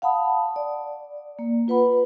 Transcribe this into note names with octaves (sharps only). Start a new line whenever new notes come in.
F5 F#5 A5 B5 D#6
D5
A#3
F4 B4 F#5 B5